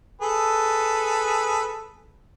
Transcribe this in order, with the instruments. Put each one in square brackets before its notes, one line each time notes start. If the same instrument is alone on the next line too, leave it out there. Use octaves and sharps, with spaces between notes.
[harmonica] G#4 A4 B4